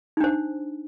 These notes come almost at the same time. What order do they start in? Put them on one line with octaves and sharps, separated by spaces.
D#4 D4 C5